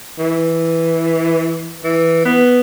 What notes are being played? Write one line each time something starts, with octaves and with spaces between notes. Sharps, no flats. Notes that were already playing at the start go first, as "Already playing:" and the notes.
E3
E3
B3